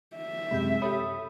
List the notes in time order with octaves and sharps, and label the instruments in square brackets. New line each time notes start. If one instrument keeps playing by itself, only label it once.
[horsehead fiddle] E5
[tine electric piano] F#2 C3 G#3 [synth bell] B5 G6
[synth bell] G4 A4 C#5 [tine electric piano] B5 D#6